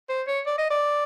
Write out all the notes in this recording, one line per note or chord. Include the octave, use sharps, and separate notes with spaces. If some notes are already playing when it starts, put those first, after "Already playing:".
C5
C#5
D5
D#5
D5